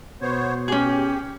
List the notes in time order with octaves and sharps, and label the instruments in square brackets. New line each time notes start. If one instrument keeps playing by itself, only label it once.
[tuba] B2 [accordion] B3 C5 C#5
[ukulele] C#4 G#4 [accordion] G4